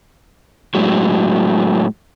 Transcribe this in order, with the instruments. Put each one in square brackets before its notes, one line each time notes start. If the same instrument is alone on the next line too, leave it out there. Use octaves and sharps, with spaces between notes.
[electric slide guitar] A2 F#3 G#3